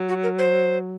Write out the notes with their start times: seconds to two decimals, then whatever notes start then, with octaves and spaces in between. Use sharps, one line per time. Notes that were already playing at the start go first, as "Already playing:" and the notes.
Already playing: F#3
0.09 F#4
0.23 A#4
0.39 C5